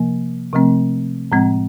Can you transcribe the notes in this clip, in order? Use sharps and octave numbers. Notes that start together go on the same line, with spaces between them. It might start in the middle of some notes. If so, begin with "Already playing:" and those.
Already playing: C3 F3 A#3
C3 F3 A3 C4
A2 F3 G#3 C4